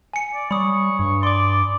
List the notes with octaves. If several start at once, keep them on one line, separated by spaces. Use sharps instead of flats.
G#5 C#7
D5
G3 C#5 B5 D#6
G2 C#5
D5 C6 D6